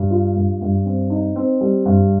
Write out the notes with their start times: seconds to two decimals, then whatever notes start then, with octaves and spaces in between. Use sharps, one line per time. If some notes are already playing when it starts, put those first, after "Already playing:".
Already playing: G2
0.10 F4
0.36 G2
0.62 G2
0.86 C4
1.10 D#4
1.36 C4
1.61 G3
1.86 G2